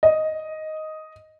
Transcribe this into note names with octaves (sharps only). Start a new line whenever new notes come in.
D#5